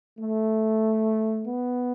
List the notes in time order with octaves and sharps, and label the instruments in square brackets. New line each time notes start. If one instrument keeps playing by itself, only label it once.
[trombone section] A3
B3